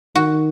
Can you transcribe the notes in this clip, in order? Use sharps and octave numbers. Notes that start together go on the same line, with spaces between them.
D#3 F#4